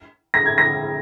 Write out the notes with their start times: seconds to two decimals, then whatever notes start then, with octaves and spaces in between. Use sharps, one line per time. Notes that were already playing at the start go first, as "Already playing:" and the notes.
0.34 A#6
0.46 G#6
0.58 A#6